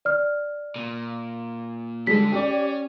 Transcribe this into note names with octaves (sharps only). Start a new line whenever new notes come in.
D5 F6
A#2
D3 G3 G#3 A4 B6
C#4 G4 D5